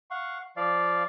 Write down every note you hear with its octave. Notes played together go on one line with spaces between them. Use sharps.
F5 F#5 C#6
F3 D5 F5